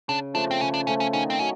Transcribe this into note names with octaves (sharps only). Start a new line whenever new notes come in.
C#3 D4
F3 A3 D4
C4
C#3 C#4
D4
F3 A3 C#4
C#4
D#3 C#4
C4
F#3 C#4